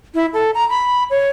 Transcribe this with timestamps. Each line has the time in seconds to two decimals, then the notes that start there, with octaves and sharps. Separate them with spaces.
0.15 E4
0.34 A4
0.55 A#5
0.69 B5
1.10 C#5